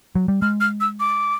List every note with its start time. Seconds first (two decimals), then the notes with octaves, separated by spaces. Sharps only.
0.15 F#3
0.28 G3
0.42 G#3 F6
0.61 F6
0.81 E6
1.00 D6